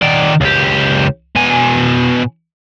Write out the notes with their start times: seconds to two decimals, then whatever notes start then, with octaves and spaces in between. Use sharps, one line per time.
0.02 D#3 D5
0.41 C#2 G4
1.35 B2 G#5